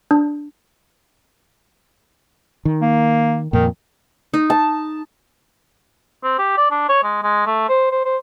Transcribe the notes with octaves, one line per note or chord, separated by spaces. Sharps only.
D4
D#3
A#3
F2 A#2 D#3
D#4
A5
C4
G4
D5
D4
C#5
G#3
G#3
A3
C5
C5
C5